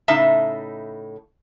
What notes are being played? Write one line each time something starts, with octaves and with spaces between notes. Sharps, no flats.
A2 C#3 D#4 E5 A5